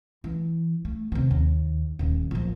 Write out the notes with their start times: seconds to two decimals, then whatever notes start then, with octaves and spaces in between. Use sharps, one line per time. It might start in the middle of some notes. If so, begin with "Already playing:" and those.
0.24 E3
0.85 A3
1.12 C3 D#3
1.31 D#2
1.99 D#1 D#2
2.31 A#1 F3